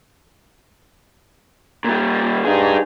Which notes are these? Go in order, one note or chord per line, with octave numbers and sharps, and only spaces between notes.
A#2 G3
G2 D#4 G#4